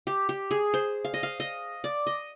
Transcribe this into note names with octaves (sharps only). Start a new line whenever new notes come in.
G4
G4
G#4
C5
F5
D#5
F5
D#5
D5
D#5